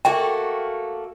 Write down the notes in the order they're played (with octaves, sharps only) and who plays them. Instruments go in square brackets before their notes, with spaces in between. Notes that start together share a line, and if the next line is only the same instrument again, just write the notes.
[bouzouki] A3 A#3 F#4 [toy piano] G5